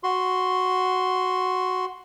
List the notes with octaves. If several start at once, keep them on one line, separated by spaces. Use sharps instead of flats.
F#4 C6